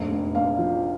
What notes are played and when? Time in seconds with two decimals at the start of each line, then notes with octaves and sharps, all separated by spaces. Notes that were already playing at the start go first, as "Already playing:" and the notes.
Already playing: F1 A#1
0.11 A#1
0.35 A#1 F5
0.58 F3